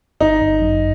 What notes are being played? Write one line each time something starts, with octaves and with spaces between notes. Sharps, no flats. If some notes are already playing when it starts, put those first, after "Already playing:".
G1 D#4
G1
F#2